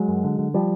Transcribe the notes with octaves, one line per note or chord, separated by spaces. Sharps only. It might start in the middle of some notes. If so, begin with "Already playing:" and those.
Already playing: F#3 G#3
F#2
D3
D3
F3 G3